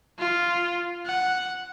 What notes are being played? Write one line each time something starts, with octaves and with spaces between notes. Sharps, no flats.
F4
F#5